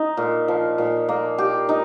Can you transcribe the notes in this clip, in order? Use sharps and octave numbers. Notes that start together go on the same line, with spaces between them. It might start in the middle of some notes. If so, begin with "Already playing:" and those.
Already playing: D#4
A#2
F3
A#2
A#3
G4
D#4